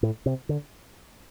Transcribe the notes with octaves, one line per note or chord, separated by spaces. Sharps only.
A2
C3
D3